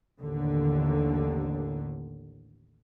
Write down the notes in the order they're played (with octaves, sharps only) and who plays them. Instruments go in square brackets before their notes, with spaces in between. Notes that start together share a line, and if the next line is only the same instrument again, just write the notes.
[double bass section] A1 D#2 D3